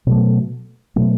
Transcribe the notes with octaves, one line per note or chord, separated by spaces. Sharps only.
B2 F#3 A3
B2 F#3 A3